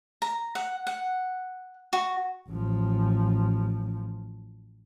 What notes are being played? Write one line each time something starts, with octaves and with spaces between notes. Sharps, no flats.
A#5
F#5
F#5
F#4
A1 F3